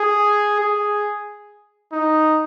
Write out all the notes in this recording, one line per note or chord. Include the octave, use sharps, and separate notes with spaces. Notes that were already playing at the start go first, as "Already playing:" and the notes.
Already playing: G#4
G#4
D#4